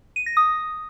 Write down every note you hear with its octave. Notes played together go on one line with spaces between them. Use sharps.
D#7
A#6
D#6